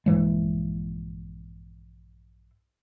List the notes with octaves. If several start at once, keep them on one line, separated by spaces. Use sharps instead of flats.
A#1 G2 E3 G#3